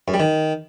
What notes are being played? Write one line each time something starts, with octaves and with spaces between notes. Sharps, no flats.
F#2
G3
D#3